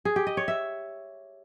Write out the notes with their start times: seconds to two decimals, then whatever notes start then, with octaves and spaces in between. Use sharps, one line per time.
0.05 G#4
0.16 G4
0.27 D#5
0.37 C#5
0.48 E5